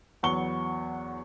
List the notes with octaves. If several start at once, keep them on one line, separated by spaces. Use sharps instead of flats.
E2 F#3 B3 C#6 G7